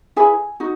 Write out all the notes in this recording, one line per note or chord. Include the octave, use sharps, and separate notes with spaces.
E4 G#4 B4 G#5
D#4 F#4